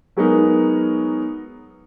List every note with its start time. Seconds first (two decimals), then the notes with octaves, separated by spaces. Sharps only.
0.17 F#3 G#3 B3 D#4 A#4